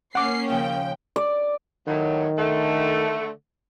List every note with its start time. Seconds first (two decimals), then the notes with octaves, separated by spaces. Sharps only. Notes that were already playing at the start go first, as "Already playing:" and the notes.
0.15 A#3 C#4 F#5 D6 C7
0.48 D#2 C#3 F3 G5
1.16 D5
1.87 A2 D#3 F#3
2.38 D3 A3